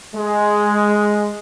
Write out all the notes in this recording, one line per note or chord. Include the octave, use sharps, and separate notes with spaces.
G#3